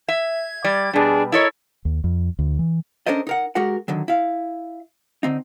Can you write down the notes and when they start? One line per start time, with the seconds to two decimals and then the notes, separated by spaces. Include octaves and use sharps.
0.08 E5 G#6
0.64 G3 D5
0.93 B2 G3 D4 G#4
1.32 E4 A4 A#4 C#5 D#5 D#6
1.85 D#2
2.04 F2
2.39 D2
2.59 E3
3.06 C#4 D4 A4 A#4 C5 D#5
3.27 D#4 A#4 F#5
3.55 G#3 F#4 G4 A#4 F#5
3.88 D3 D#3 F#3
4.08 E4 F5
5.23 D3 C4 D#4